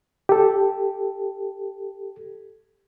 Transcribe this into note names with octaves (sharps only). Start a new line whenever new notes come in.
G4 A4